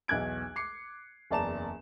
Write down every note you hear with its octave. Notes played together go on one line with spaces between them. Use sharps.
B1 E2 F#6 G#6 D7
D6 C7 C#7
F#1 E2 D5 A5 A#5 E7